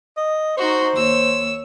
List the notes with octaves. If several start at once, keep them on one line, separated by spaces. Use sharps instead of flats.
D#5
D#4 F#4 C5 C6 C#6
D#2 C#5 E6